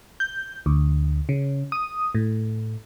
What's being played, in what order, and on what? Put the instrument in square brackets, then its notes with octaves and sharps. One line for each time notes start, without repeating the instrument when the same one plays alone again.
[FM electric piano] G6
D2
C#3
D#6
A2